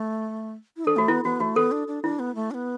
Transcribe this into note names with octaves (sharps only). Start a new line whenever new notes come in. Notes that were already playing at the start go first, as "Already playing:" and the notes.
Already playing: A3
E4
D4 A4
A3 F#4
B3 E4
B3 F#4
A3 F#4
B3 A4
D4
D4
D4 E4
B3
A3
D4
B3